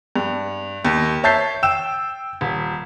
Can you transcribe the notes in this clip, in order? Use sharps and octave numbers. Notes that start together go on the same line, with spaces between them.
G2
D#2
C#5 E5 A5 G6 A6 C7
G5 E6 E7
D#1